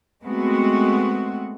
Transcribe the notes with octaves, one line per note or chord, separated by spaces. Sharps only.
G#3 A3 B3 C4 F#4